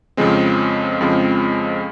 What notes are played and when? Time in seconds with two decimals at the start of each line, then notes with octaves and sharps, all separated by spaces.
0.17 F2 C#3 F3 G#3 C4
1.01 F2 C#3 F3 G#3 C4